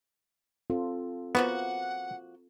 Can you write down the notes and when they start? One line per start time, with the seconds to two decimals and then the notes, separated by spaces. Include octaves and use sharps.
0.70 C4 F4 A4
1.35 F3 A#3 B3 F#4 F#5